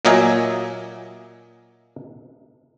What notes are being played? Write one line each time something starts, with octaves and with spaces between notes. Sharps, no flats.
A#2 F#3 A#3 D#5 E5 G#5